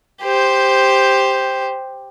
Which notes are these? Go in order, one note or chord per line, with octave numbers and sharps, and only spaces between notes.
G4 C5